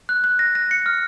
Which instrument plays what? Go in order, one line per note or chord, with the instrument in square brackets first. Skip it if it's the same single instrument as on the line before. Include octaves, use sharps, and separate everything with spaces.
[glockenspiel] F#6
F#6
A#6
A#6
C#7
F6